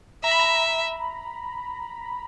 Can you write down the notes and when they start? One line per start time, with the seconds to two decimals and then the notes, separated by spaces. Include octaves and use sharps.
0.24 E5 A#5
0.31 B5
0.39 A#5